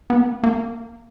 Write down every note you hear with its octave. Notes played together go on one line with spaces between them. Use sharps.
B3
A#3
A#3